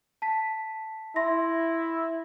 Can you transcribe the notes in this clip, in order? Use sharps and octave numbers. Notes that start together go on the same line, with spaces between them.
A5 B6
E4 E5 C6 A#6